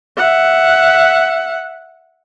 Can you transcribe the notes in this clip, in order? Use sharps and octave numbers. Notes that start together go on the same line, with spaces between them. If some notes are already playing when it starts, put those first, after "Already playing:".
E5 F#5